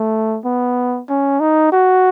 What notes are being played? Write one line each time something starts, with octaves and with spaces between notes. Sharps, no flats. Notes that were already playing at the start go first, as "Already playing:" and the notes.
Already playing: A3
B3
C#4
D#4
F#4